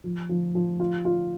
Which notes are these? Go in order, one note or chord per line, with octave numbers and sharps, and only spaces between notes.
F3
F3
F3
F4
F4